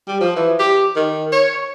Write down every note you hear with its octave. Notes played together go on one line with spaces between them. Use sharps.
G3
F3
E3
G4
D#3
C#5